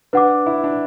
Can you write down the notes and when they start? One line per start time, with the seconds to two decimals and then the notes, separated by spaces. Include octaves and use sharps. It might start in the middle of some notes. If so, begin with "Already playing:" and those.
0.13 D4 B4 F#5 D6
0.46 E4
0.64 D4